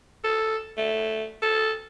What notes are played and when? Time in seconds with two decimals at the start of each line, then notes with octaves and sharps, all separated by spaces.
0.24 A4
0.78 A3
1.42 A4